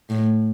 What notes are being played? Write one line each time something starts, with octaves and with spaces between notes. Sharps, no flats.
A2